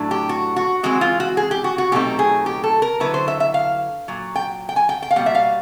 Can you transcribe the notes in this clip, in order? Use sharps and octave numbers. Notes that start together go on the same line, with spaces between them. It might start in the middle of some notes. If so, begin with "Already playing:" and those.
Already playing: A2 F#3 A3 D4
G4
F#4
F#4
E3 G#3 C4 F#4
F4
F#4
G#4
G4
F#4
F#4
B2 F#3 A3 C4 D#4 G4
G#4
G4
A4
A#4
D3 F#3 B3 E4 B4
C5
E5
E5
F5
A#2 F#3
G5
G5
G#5
G5
G5
F5
B2 G3 A#3 F#5
E5
F5